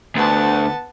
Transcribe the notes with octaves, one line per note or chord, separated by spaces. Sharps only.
D2 B3 A5